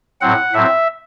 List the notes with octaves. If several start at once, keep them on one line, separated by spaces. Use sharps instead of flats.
A2 F#3 C4 F#5
A2 F#3 C4 E5